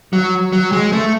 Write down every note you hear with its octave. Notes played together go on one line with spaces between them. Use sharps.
F#3
F#3
G#3
A3